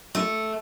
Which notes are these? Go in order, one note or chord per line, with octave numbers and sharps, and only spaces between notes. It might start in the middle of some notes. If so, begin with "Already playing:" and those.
A3